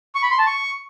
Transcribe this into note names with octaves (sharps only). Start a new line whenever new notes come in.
C#6
B5
C6
A5
C#6